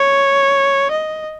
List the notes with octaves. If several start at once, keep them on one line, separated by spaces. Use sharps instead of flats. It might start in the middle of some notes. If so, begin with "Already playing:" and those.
Already playing: C#5
D#5